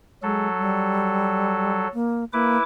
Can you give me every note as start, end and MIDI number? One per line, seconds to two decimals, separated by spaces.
0.23 1.88 54
0.23 0.48 56
0.23 1.88 69
0.59 1.85 55
1.94 2.25 58
2.33 2.57 58
2.33 2.63 64
2.33 2.63 71
2.33 2.63 86